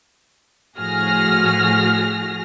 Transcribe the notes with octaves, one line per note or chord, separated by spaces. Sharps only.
A2 F3 F#4 G#4 F6 A#6